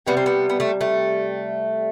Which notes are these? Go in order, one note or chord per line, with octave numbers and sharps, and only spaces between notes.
C3 G3 B3
C4
B3
B3
A3
A3